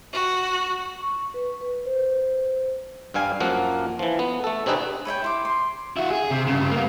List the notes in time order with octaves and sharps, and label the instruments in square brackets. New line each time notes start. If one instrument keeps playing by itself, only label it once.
[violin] F#4
[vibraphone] C#6
B4
B4
C5
[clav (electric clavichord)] G2 G3 F5 G#5
F#2 F3 A#3 A#4 F#5
E3 F3
B3
A3 A4
C3 C4 D4 D#4 G#4 B4
[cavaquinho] B4 C#5 E5 G5
E4 C6 D6
C6
[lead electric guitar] E4 F#4
G#4
C3
G2 C#3
A#3 B3